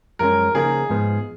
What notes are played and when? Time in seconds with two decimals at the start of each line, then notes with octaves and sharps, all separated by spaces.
0.19 F#2 F3 G#3 C#4 A#4
0.54 C#3 F3 A#3 D#4 G#4 A#4
0.90 G#2 F3 B3